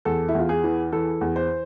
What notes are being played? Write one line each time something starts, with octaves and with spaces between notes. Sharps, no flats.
E2 A4
E4
E2 F4
G#4
E3
E3 A4
E2
C5